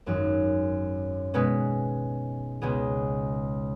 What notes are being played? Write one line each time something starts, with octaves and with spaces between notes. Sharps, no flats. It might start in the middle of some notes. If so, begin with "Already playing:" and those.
G#1 F#2 D#3 F#3
B2 G#3 C#4 B4
C#2 B2 B3 G#4